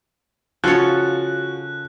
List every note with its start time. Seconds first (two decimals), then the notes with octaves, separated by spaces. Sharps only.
0.64 C#3 F3 F#4 A4 C#5 F#6